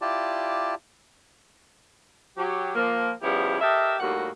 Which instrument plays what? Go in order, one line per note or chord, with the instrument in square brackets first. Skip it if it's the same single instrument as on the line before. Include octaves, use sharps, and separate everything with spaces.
[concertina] E4 F4 G4 D5 A5
[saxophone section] F#3 G4
F3 A#3
C#3 F3 G3 B3 E4 G4
G4 A4 A#4 D#5 E5
D#2 A2 G3 A#3 F#4 F#5